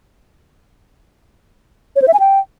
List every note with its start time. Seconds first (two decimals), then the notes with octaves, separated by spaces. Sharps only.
1.96 C#5
2.02 C5
2.08 E5
2.14 G#5
2.20 G5